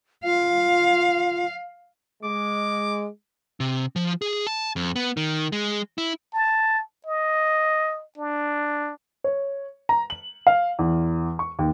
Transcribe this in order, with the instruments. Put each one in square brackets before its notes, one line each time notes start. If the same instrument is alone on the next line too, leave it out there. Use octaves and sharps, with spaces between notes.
[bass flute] F4 [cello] F5
[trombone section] G#3 [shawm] D6
[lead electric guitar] C3
F3
G#4
A5
F2
B3
D#3
G#3
E4
[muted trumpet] A5
D#5
D4
[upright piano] C#5
A#5
F#7
F5
E2
C#6
D#2